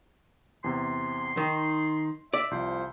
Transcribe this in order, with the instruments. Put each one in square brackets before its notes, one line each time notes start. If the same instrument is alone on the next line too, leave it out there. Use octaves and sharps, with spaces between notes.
[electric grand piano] E2 C3 [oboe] C6
[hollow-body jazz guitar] D#3 [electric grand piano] D#4
[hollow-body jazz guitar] D5 [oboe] E5
[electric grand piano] C2 F3 [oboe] C5